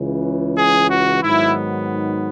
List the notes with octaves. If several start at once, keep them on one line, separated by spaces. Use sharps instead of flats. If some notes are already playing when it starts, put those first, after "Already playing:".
Already playing: C#2 C#3 E3
G#4
F#4
G#2 D#3 F#3 B3 E4